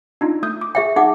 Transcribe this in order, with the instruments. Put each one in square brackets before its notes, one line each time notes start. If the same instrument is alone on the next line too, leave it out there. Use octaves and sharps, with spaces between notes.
[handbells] D4 D#4 F4
A3 D#6 G6
D6
[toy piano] G#4 E5 G5
[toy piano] D#4 F#5 D6 [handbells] G#4